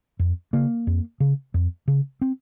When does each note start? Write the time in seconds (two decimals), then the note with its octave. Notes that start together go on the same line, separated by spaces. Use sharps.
0.19 F2
0.53 C#3 A#3
0.87 F2
1.20 C#3
1.54 F2
1.88 C#3
2.21 C4